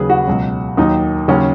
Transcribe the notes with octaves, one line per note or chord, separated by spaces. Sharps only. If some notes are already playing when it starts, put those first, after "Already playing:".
Already playing: D#2 C#3 F#3 G#4 B4
F#4
C#2 B2 F#3
D#2 D#3 F#3 D#4
D#2 C#3 F#3 C#4